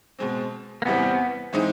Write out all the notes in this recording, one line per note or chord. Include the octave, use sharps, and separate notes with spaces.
B2 G#3 C4
A#3
E2 C3 E3 G3 B3 C4
E3 G#3 C4 D#4